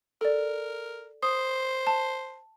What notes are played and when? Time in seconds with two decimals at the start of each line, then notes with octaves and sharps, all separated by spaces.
0.21 A4 A#4 D5
1.23 C5 D#6
1.87 A5